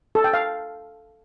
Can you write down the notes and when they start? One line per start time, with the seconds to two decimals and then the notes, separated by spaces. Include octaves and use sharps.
0.15 A4
0.24 G5
0.33 F5